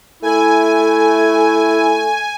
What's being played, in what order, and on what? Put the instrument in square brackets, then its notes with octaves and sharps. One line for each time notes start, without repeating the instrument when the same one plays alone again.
[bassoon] A3 [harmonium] E4 [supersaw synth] G#5